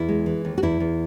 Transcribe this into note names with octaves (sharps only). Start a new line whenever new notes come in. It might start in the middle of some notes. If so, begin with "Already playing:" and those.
Already playing: E2 E4
G#3
E3
D#2
F#4
E2 E4
E2